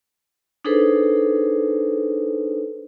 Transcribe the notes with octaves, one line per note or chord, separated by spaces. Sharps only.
D4 D#4 G#4 A4 B4 C5